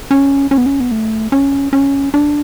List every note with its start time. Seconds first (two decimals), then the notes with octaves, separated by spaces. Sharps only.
0.11 C#4
0.51 C#4
0.58 B3
0.66 C#4
0.80 B3
0.91 A3
1.32 C#4
1.73 C#4
2.14 D4